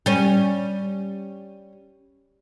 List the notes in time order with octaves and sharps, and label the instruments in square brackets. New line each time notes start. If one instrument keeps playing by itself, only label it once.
[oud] G3 C#4